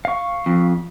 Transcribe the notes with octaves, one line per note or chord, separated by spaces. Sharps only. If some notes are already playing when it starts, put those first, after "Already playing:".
F5 C#6
F2